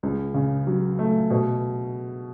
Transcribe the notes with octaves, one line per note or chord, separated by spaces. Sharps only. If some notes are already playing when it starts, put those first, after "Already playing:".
C#2
C#3
F#3
A3
B2